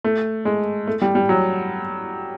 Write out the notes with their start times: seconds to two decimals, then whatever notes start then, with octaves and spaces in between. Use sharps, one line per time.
0.04 A3
0.45 G#3
0.87 A3
1.02 G3
1.15 G3
1.29 F#3